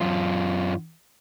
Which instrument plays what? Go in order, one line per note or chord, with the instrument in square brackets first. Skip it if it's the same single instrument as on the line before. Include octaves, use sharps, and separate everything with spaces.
[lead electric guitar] F#2 F4